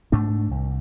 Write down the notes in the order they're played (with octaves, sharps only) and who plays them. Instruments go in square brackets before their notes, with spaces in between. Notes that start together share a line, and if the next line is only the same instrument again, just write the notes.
[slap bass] G#2 A3 D4
C2